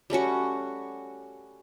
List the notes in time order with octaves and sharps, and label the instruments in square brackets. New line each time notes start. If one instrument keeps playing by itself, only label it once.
[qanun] G3 A3 C#4 F#4